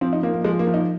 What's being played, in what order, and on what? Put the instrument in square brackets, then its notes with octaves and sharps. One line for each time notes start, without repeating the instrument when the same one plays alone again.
[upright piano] F3 C4
D#4
F3 A#3
A#3
F3 G#3
A#3
F3
D#4